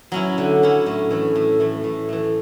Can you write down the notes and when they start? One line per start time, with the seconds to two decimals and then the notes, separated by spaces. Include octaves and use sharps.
0.12 F#3 C#4 E4
0.38 D3
0.62 F#3 C#4 E4
0.86 A2
1.11 E3 A3
1.36 A2
1.60 E3 A3
1.84 A2
2.09 E3 A3